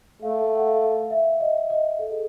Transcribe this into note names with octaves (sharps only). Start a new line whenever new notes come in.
A3 F5
F#5
F5
E5
D#5
D#5
A4
G#4